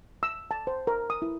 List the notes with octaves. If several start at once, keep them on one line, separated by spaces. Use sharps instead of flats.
E6
A5
C5
A#4
D#6
E4